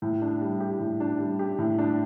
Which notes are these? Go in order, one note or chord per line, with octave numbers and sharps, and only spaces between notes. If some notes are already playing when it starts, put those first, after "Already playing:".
A2
D4
G3
G4
A2
D4
G3
G4
A2
D4